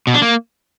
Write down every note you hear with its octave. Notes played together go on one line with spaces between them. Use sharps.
B2
D4
A#3